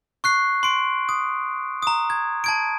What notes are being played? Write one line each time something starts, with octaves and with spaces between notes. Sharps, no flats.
C#6 F#6 C7
C6 D7
D#6
A#5 D#6
G#6
A5 G#6 D7